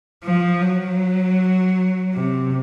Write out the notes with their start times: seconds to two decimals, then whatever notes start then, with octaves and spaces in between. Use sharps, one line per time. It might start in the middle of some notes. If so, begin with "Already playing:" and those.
0.24 F3
0.62 F#3
2.15 C3